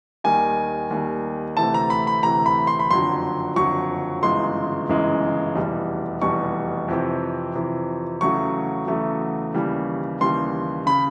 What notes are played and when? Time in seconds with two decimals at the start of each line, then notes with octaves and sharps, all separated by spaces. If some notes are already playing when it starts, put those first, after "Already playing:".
0.24 D#2 D#3 G3 G#5
0.91 D#2 D#3 G3
1.57 D2 C3 E3 A3 A5
1.74 A#5
1.90 B5
2.07 B5
2.23 D2 C3 E3 A3 A#5
2.46 B5
2.67 C6
2.79 B5
2.90 F#1 F2 D3 F#3 C6
3.56 F#1 F2 D3 F#3 C#6
4.23 G1 F#2 C#3 E3 G#3 C6
4.89 G1 F#2 C#3 E3 G#3
5.55 F1 E2 B2 G3
6.22 F1 E2 B2 G3 C#6
6.88 F2 C3 E3
7.55 F2 C3 E3
8.21 E2 C#3 F#3 A3 C#6
8.87 E2 C#3 F#3 A3
9.54 D#2 C#3 E3 G3
10.21 D#2 C#3 E3 G3 C6
10.86 C#3 B5